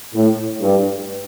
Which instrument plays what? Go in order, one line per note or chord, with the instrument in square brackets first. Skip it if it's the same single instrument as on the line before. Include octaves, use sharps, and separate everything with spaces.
[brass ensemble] A2
G2